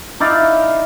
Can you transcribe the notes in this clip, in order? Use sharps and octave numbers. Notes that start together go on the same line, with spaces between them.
D#4 E4 D5 F5